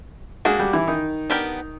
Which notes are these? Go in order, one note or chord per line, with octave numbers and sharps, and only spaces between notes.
G#3 A#3 D4 F#4 G#4
G3 G4
E3 E4
D#3 D#4
B3 D4 G4 A#4